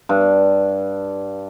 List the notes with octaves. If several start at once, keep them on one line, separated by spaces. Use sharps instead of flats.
G2